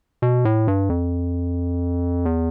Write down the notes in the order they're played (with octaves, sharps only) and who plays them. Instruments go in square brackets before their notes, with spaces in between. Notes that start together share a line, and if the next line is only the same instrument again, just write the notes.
[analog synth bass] B2
A2
G2
F2
E2